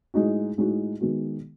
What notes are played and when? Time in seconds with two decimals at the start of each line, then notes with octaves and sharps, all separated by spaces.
0.14 A2 G#3 D#4 F#4
0.58 A2 G#3 D#4 F#4
1.01 D#3 G#3 B3 F#4